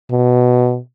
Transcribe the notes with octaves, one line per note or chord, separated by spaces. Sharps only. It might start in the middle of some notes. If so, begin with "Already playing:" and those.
B2